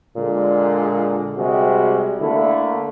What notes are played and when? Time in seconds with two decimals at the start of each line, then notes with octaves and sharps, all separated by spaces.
0.17 A#2 D3 G#3
1.38 C3 G3 G#3 F#4
2.22 D3 A3 A#3 E4